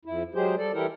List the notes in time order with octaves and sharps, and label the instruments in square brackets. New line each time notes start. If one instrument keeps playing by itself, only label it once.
[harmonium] F2 E4
F#3 G#3 G4 G#4 C5
G3 A4 D5
E3 G3 E4 G4 A4 A#4